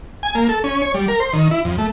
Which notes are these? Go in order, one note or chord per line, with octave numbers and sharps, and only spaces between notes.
G#5
A#3
A4
C#4
C#5
G3
A#4
C5
D#3
E4
F2
A3